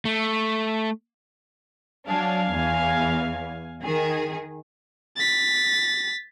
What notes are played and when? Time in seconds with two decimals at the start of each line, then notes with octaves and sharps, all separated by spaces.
0.05 A3
2.08 F#3 D4 F5 G#5
2.50 E2
3.82 D#3 G#4
5.16 A6 B6